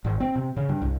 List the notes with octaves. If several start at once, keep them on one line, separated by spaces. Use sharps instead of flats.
G#1
C4
C3
C#3
G2
C2